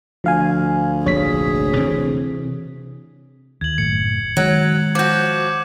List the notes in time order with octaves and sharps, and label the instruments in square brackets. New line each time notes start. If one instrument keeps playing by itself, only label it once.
[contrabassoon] D2 [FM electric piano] F3 F5 G#5
[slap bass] F1 A#1 [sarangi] G#4 [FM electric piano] C#5 B6
[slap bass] C3 E3 C4
[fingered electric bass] D#2 [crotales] G#6 F#7
[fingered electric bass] F#1 A2 [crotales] C#7
[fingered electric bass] D#3 G#3 [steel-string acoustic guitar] F#3
[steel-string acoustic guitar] F3 F#4 [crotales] D6 G6